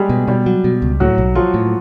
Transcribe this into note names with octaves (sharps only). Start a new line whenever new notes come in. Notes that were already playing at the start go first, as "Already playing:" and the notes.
Already playing: G3 G#3 G4 G#4
B2
B2 G3 G4
F#3
B2
C#2
A2 F#3 F#4
B1
F3 F#3 F4
A2